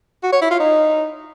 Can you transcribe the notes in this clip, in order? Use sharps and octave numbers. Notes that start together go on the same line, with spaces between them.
F#4
C#5
E4
F4
D#4